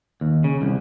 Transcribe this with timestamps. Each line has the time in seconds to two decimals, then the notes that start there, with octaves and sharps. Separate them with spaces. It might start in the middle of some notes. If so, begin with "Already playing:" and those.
0.21 D#2
0.44 C#3
0.62 C2